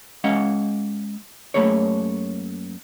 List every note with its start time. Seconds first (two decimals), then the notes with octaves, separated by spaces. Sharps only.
0.24 G#3 C#4 F5 F#5
1.54 F#2 F3 A3 A#3 G#4 C#5